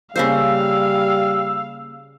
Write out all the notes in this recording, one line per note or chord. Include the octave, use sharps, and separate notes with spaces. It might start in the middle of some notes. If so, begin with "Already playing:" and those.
C#3 G3 A#3 C5 F5 E6